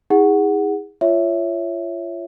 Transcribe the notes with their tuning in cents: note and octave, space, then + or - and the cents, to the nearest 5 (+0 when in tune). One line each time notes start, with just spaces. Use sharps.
E4 -45 G#4 -25 F#5 +0
F4 -20 C#5 +0 E5 +0